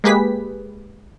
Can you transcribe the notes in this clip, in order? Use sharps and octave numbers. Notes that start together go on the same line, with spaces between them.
G#3 A#3 G4 G#4 B4 B6